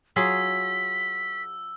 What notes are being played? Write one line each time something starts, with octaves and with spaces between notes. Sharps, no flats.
F#3 F4 G#4 E6 B6